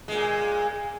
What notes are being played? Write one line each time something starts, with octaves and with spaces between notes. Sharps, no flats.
A#2 G#3